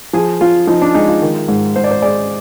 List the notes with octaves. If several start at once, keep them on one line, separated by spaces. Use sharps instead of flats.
F3 G#4
F3 F4
F3 D#4
D4
G#3 D#4
F4
D#3
G#2
G#2 C5
D5
C5
G#3 D5